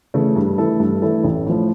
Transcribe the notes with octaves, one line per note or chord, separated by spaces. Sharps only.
C#3 E3 A3 C#4
G2
E3 A3 E4 A4
G2
E3 A3 E4 A4
A1
A2 F3